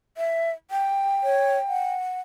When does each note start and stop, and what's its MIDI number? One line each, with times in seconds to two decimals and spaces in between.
0.17 0.50 76
0.71 1.95 79
1.23 1.57 73
1.68 2.21 78